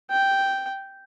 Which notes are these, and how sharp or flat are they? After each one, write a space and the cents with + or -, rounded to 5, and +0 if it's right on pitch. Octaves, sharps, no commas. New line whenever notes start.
G5 -5